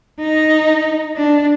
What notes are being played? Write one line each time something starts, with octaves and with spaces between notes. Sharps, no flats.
D#4
D4